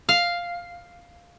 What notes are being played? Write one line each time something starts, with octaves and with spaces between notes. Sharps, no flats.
F5